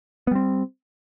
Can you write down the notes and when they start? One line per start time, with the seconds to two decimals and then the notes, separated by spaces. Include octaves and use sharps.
0.27 B3
0.31 G3
0.35 C4